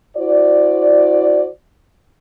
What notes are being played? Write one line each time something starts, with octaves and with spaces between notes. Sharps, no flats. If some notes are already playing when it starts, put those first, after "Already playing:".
E4 F#4 C5 D5